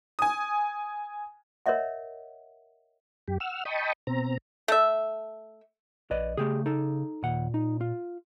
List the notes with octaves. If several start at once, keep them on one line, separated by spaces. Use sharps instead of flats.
G#5 D#6
A#4 C#5 D#5 E5 F#5
F#2 G4
F#5 E6 F6
D#5 G5 A5 B5 C#6 D#6
B2 C4 A#5
A3 E5
A#1 B4 D5 D#5
C#3 A3 G4 G#4
D#4 A4
D#2 A#2 F#5
D#4
F4